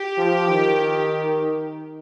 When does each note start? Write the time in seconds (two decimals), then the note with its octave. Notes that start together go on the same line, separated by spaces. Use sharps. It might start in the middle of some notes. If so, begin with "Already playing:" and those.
Already playing: G4
0.17 F3
0.50 D#3